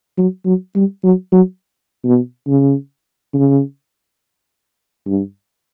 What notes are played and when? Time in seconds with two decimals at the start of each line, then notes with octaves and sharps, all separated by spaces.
0.18 F#3
0.45 F#3
0.75 G3
1.04 F#3
1.32 F#3
2.05 B2
2.47 C#3
3.34 C#3
5.07 G2